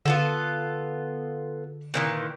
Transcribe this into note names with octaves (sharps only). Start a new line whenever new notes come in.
D3 B3 F4 A4
A#2 D#3 E3